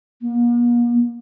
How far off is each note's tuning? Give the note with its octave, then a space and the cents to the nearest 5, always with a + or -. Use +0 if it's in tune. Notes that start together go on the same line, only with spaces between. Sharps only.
A#3 +45